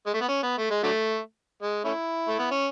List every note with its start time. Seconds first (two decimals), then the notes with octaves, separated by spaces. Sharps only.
0.07 G#3
0.14 A3
0.22 B3
0.29 C#4
0.43 B3
0.58 A3
0.71 G#3
0.83 D3 F#3 A3
1.62 G#3
1.84 A3 C#4 E4
2.27 A3
2.39 B3
2.51 C#4